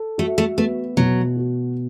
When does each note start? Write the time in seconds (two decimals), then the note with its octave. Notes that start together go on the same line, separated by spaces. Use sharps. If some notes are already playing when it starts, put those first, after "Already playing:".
Already playing: A4
0.18 A3 F#4
0.38 A3
0.58 A3 B3
0.97 B2 F#3
1.37 F#4